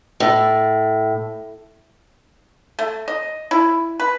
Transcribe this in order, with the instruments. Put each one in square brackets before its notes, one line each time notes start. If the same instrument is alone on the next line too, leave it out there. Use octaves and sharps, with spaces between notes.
[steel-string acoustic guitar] A2
[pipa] A3
D#5
E4
B4